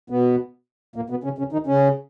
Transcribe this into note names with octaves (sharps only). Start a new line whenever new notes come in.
B2 B3
A#2 A#3
B2 B3
C#3 C#4
C#3 C#4
D#3 D#4
C#3 C#4